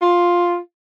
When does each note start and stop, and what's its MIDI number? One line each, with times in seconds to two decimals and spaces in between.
0.02 0.58 65